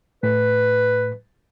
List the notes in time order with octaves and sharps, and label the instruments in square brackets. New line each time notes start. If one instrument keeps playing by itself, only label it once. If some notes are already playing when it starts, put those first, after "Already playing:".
[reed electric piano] A2 [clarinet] B4